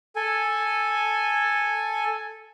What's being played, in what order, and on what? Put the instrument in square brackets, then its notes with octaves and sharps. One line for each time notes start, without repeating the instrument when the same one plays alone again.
[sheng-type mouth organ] A4 G#5